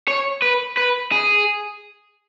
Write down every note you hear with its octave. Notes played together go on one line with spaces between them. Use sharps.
C#5
B4
B4
G#4